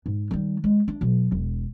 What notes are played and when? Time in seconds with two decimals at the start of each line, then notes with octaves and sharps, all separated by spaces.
0.06 G#2
0.31 D#3 G3
0.64 G#3
0.88 D4
1.01 B2 F#3
1.32 E1